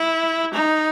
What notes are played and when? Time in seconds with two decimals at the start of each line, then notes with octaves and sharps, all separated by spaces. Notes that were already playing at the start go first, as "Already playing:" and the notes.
Already playing: E4
0.53 D#4